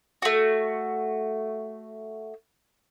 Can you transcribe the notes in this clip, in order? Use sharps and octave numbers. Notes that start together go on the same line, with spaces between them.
A3 F#4